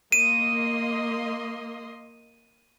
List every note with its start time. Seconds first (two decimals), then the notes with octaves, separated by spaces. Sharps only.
0.12 A#3 D#5 C6 D#7